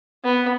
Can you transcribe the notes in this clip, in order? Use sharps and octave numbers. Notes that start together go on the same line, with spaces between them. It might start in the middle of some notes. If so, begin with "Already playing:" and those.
B3